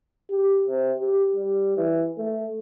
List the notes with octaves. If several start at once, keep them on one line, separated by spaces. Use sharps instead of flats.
G4
C3
G4
G3
E3
A3